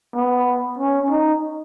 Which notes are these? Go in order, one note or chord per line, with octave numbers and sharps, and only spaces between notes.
B3
C#4
D#4